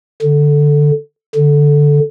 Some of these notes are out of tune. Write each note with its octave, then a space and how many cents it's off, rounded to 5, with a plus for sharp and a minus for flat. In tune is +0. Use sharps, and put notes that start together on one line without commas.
D3 +0
D3 -5